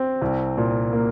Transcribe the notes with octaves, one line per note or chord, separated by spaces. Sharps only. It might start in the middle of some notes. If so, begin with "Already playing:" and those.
Already playing: C4
C2
A#2
A#3